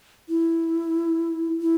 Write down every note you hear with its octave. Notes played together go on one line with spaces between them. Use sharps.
E4
E4